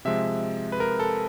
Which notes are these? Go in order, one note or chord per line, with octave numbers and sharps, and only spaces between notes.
C3 F3 G#3 E5
B4
A#4
A4